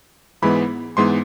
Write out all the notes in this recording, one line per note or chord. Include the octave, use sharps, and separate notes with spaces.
G#2 E3 G#3 B3 B5
G#2 E3 G#3 B3 C6